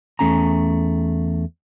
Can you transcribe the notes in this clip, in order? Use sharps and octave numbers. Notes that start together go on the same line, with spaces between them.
E2 A3 C#4 G#5 A#5